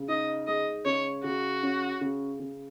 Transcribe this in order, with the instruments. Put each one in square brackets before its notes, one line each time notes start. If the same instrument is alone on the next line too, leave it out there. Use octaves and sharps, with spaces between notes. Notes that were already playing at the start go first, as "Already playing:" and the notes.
Already playing: [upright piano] C#3
[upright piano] D#4 [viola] D#5
[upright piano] G#3 [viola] D#5
[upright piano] C#3 [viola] C#5
[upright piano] C#3 [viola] F#4
[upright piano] C#4
C#3
C#3